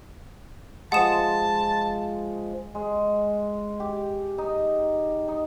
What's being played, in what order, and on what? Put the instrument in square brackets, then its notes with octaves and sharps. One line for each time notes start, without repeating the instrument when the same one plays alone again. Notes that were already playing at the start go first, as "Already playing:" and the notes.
[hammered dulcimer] F3 G#3 [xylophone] F#5 D#6 E7 [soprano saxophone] A5
[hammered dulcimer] G#3
G4
D#4
D#4